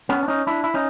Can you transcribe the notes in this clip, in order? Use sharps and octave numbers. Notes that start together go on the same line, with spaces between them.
B3 C#4
D4
C#4 D#4
D4 E4
E4
C#4 D#4